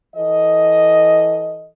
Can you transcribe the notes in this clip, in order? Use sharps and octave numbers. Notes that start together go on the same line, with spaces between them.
E3 A4 D#5